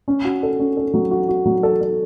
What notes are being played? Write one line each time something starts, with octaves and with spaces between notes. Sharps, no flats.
C#4
F#4
A4
C#4
A4
F#3
F#4
F#4
F#3
A4
A4